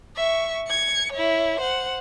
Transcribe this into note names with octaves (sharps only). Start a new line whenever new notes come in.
E5 C#6
G#6 C#7
E4 C#5
C5 F#5